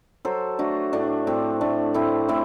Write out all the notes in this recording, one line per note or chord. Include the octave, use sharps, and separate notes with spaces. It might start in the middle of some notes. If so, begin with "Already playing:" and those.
F#3 A4 C5
A3 D4 F#4
A2 D4
A2 C4
A3 D4
A2 C4 E4
A2 C4 E4